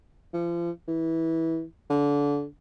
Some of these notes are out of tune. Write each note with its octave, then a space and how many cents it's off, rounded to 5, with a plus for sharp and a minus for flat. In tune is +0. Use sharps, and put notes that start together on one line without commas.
F3 -35
E3 -20
D3 -25